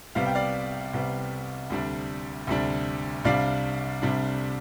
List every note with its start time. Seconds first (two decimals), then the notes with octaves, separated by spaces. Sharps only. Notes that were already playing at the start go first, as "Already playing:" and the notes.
0.15 C2 C3 G3 B3 F5
0.26 G5
0.35 D5 F5
0.93 C2 C3 G3 B3
1.70 D2 C3 G3 D4
2.47 D2 C3 G3 D4
3.25 C2 C3 G3 D4 D5 F5
4.02 C2 C3 G3 D4